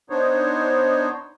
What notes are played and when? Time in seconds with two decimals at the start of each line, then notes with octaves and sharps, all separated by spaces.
0.10 B3 D4 D#4 C5 C#5